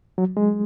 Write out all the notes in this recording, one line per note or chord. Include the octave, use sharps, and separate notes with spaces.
F#3
G#3